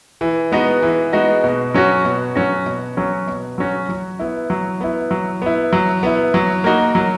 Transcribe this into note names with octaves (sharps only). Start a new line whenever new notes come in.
E3
G#3 B3 D#4 F#4
E3
G#3 B3 D#4 F#4
B2
F#3 C#4 F#4
B2
F#3 C#4 F#4
B2
F#3 C#4 F#4
B2
F#3 C#4 F#4
F#3
B3 E4
F#3
B3 E4
F#3
B3 E4
F#3
B3 E4
F#3
A#3 D#4 F#4
F#3